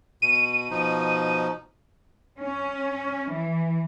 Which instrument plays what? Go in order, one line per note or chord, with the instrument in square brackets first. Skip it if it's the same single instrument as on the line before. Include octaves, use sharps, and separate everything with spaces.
[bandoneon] B2 [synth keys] D#7
[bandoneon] B2 F3 D#4
[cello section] C#4
E3